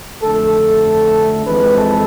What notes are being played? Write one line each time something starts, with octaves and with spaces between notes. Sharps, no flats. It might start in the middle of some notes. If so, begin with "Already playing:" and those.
F2 D3 A3 A4
F2 E3 G#3 C4 B4
A4